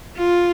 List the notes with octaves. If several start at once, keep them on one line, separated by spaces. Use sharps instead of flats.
F4